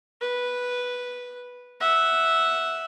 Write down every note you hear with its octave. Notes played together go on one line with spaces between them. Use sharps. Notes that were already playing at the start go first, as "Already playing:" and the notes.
B4
E5 F#5